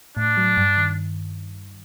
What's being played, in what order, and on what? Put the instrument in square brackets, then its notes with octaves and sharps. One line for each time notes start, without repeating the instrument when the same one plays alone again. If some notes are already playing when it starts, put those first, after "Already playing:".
[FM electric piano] A2 [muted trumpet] D4
[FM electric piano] F#3
G2
D#3